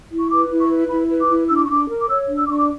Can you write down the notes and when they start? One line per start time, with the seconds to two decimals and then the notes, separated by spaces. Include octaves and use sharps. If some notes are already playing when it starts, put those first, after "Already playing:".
0.11 E4
0.19 C#6
0.31 B4 D6
0.51 E4
0.60 C#6
0.70 B4
0.89 E4 B5
1.09 B4
1.20 D6
1.29 E4
1.49 D4 E6
1.56 D6
1.63 C#6
1.69 D4 D6
1.88 A#4
2.01 D6
2.08 C#5 E6
2.28 D4
2.37 E6
2.45 D6
2.48 D4 C#6
2.59 D6